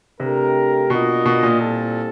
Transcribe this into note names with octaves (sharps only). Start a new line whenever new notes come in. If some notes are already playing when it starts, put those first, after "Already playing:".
C3 A3 D4 G4 A#4
B2 A#3 D4 F4 A#4 D#5
B2
A#2
G3 C4 E4 A4